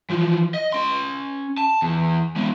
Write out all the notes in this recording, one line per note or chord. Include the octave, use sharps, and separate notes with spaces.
E3 F3
D#5
C#4 C6
A5
E2
G#3 B3